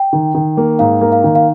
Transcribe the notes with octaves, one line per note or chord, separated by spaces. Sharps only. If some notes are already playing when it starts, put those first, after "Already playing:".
Already playing: G5
D#3
D#3
A#3
G#2 F5
A#3
F5
D#3
F5